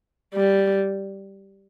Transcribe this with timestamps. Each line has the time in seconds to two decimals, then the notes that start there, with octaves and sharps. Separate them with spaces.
0.34 G3